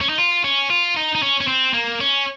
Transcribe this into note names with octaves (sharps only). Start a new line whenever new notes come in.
C#4
D#4
F4
C#4
F4
D#4
D#4
C#4
C#4
C4
A#3
C#4